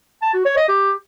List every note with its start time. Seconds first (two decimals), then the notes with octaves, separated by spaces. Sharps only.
0.22 A5
0.34 F#4
0.45 C#5
0.57 D#5
0.68 G4